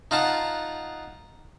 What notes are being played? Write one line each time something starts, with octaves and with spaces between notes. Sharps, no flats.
D#4 F4 F#5 A5